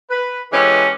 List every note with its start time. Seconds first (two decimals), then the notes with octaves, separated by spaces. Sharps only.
0.10 B4
0.53 E3 G#3 C#4 G4 A4 B4